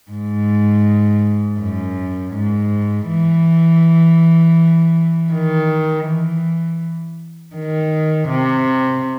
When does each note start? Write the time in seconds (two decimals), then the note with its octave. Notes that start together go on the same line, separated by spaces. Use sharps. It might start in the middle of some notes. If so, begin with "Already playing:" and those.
0.11 G#2
1.60 F#2
2.35 G#2
3.10 E3
5.33 D#3
6.06 E3
7.55 D#3
8.30 C3